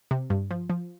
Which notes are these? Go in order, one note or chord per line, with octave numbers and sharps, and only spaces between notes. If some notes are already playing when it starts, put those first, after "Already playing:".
C3
G2
F3
F3